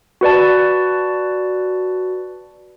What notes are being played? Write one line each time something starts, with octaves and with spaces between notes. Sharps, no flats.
F#4 B4 D5 A5